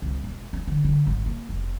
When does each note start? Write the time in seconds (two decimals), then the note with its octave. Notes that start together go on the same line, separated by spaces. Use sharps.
0.02 C2
0.24 E1
0.53 C#4
0.67 D3
0.84 D3
1.06 G#1
1.26 A#3
1.49 F1